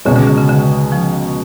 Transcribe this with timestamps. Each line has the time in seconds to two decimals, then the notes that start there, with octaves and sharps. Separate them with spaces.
0.05 C#2 B2 D3 G#3 C#4
0.16 D3
0.27 D3
0.38 C#3
0.49 D3
0.92 F3